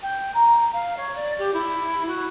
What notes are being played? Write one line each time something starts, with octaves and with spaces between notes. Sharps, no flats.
G5
A#5
F5
C#5
D5
G4
E4
F#4